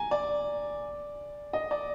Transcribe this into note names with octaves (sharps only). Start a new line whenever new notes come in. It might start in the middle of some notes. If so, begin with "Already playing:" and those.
Already playing: G#5 A#5
D5
D#5
D5